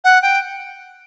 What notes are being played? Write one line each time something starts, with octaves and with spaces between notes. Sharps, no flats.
F#5
G5